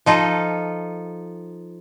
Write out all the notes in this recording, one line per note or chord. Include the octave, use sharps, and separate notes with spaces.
F3 D#4 F4 A4